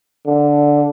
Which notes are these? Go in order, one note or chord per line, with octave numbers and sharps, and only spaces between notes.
D3